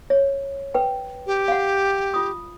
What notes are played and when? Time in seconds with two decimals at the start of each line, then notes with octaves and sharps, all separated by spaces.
0.10 C#5
0.74 B4 G5
1.26 G4
1.48 F5 F#5
2.14 F4 D#6